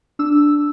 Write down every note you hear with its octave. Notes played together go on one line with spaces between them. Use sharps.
D4 E6